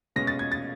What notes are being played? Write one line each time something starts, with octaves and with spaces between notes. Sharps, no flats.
B2 G#3 C#4 A#6
A6
G#6
A6